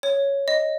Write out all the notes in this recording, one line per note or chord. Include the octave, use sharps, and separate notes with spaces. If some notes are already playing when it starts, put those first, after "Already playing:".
C#5
D#5